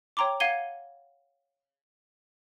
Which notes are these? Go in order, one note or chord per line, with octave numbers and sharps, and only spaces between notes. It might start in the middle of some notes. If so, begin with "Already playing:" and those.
C#5 G5 A#5 C6 D6
F5 F#5 G#6 D#7 G7